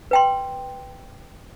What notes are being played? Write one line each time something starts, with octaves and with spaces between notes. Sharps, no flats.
B4 G5 C6